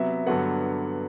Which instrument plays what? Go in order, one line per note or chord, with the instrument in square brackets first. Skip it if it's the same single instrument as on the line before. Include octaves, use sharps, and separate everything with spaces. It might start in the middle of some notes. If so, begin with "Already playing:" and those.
Already playing: [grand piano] C3 F#3 B3 E5
G2 D3 F#3 B3 F#5